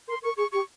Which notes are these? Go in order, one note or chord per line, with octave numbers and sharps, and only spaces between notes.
A#4 C6
A#4 C#6
G#4 C#6
G4 C#6